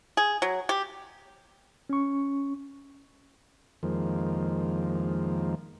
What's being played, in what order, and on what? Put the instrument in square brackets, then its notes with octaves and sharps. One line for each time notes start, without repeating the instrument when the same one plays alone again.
[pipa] G#4
F#3
G4
[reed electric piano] C#4 C#6
[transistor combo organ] F2 D#3 F3 G#3 A#3